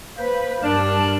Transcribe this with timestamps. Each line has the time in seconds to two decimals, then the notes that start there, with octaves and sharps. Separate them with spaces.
0.18 A#3 B4 C5
0.63 G2 G3 D4 A#4 A5